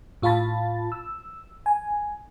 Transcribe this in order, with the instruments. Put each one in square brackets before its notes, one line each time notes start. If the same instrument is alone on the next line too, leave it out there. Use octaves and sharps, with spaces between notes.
[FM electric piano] A2 F4 F5 A5 B5 A6
E6
G#5